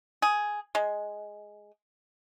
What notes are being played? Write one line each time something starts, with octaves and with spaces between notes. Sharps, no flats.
G#4
G#3